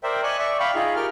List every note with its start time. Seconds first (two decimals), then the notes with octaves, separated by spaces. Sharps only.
0.03 A#4 C5 D5 E5 G5
0.23 D5 D#5 G#5 C#6 F#6
0.39 D5 E5 C#6
0.60 F5 G5 B5 C#6
0.75 D#4 F4 G#4
0.96 G4 A#4 G5 F6